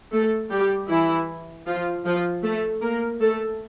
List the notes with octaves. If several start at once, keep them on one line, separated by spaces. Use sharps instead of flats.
A3 A4
G3 G4
E3 E4
F3 F4
F3 F4
A3 A4
A#3 A#4
A3 A4